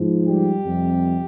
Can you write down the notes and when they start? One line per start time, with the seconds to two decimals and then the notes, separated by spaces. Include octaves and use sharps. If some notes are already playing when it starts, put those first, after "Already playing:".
Already playing: G#2 F3
0.27 G3 G4
0.64 F2 C3 G3